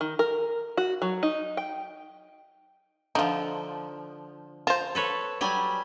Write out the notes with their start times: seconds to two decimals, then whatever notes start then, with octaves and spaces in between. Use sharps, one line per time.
0.01 D#3
0.19 A#4
0.77 F#4
1.02 F#3
1.23 D#4
1.57 G5
3.15 D3 F3 D#4 F4
4.67 F4 C5 A5 A#5
4.95 A4 B4 C#5
5.41 F#3 G3 G#5